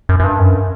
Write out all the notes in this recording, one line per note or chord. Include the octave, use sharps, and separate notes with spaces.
F#2
F#2
G2
F#2